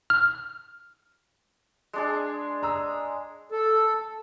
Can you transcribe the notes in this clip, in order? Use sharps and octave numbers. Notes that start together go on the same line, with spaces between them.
F6
G#3 D4 G#4
A#5 D#6 E6
A4